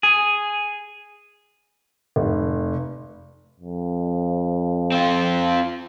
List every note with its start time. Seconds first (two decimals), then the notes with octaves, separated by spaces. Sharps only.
0.03 G#4
2.16 F1
3.60 F2
4.92 C4 F4